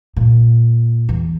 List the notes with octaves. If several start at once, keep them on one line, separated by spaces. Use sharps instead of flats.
A#2
E2